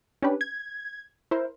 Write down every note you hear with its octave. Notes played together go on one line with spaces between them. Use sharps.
C#4 D4 G4 B4
G#6
E4 A#4 C5